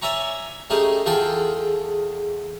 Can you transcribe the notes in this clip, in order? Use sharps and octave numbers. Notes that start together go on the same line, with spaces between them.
C#5 D5 E5 G#5 A#5 C#6
A3 C#4 D#4 G4 G#4
E2 F4 G#4 A4 G5 C6